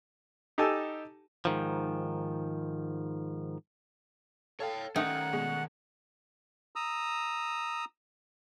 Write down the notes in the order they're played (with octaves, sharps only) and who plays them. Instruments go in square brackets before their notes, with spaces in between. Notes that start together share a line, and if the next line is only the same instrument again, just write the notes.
[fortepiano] D#4 G4 A4 G#5 A5 E6
[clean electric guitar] G#2 D#3 F3
[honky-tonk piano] A4 F5 [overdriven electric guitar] C#5 G5
[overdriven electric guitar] D#3 C#4 [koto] A3 D#4 [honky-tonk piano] A#4 G5 [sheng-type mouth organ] F#5
[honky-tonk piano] B2 G#3
[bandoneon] A#5 D#6 E6